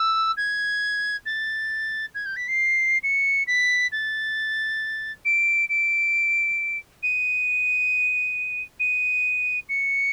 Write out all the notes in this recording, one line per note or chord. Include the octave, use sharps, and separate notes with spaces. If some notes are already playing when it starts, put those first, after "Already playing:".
Already playing: E6
G#6
A6
G#6
G6
B6
C7
C#7
B6
A6
D7
D7
D#7
D#7
C#7